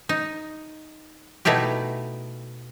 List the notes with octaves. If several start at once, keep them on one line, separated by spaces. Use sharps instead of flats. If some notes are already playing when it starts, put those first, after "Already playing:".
D#4
B2 A3 D#4 E4 G4